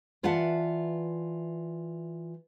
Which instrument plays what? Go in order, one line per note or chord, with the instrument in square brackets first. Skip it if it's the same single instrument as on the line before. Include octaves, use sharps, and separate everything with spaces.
[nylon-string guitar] E3 F4 D5 E5 F#5 A5